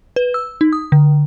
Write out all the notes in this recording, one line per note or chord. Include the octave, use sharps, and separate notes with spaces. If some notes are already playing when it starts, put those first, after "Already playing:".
B4
E6
D#4
D#6
D3